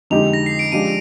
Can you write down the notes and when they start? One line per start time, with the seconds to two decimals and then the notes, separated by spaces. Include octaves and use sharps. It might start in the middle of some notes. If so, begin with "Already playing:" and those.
0.10 F2 D3 G#3 D#4 G4 F7
0.33 A#6
0.46 C7
0.59 D7
0.72 F3 G#3 D4 G4 D#7